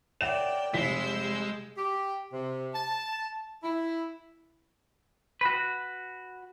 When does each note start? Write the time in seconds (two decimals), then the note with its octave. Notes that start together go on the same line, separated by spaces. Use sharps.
0.21 A#4 C#5 D5 E5 F#5 G5 E7
0.74 F1 G3 G#3 E6 G6 B6
1.76 G4
2.32 C3
2.73 A5
3.62 E4
5.41 F#4 B4